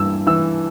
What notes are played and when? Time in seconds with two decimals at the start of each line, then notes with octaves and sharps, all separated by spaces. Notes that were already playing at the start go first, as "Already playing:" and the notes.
Already playing: G2 E3 E6
0.27 E3 E6